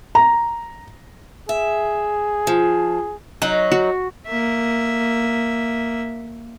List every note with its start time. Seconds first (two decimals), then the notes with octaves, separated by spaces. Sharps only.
0.15 A#5
1.49 G#4 E5
2.47 F3
3.42 F#3 D#4
3.72 F#4
4.27 A#3 E5